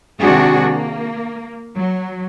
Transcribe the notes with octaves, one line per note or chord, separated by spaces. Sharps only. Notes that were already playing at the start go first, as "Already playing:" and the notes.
C3 D#3 G#3 D4 F#4 G#4
A#3
F#3